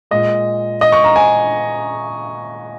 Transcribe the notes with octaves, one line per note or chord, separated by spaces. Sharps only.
A#2 G#3 D#5
D#5
C#6
A#5
G#5